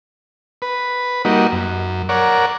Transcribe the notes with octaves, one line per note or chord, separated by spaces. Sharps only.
B4
G3 A#3 D#4 F#4
F#2
A#4 C#5 D5 F#5